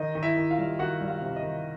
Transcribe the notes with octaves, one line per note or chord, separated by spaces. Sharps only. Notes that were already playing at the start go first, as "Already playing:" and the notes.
Already playing: D#3 D#5
D#3
E4 E5
D#3
F4 F5
G3
D#3 F#4 F#5
G3
F4 F5
C3
D#5
D#3